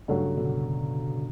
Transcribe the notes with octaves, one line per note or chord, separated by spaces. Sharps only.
G2 C#3 F#3 A3 D4 F#4
B2 D3